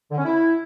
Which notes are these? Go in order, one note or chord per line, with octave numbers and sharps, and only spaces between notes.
D3
C#4
E4